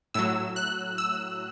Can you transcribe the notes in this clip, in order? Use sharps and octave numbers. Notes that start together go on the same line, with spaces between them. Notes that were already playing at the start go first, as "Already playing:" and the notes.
A2 F#3 E6
F#6
E6